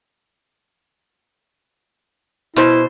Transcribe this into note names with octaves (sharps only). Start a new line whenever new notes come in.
B2 E4 C5